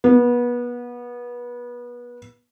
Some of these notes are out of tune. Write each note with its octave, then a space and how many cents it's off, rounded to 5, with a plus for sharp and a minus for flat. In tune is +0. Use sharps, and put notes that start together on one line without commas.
B3 -30